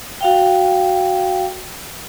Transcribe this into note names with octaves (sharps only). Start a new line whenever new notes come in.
F#4 F5 G5